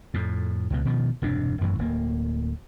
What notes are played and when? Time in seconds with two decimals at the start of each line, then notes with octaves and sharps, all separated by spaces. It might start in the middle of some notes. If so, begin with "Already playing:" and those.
0.14 F2 A2
0.70 C#2 B2
0.85 B2 D#3 F3
1.22 E1 G2 C3 D4
1.61 A1 F#2 E3
1.79 D1 A#3